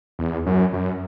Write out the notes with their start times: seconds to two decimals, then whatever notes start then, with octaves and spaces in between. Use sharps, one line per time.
0.19 E2
0.46 F#2
0.73 F#2